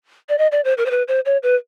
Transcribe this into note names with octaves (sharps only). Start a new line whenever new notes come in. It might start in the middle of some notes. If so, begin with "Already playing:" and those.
D5
D#5
D5
C5
A#4
C5
B4
C5
C#5
B4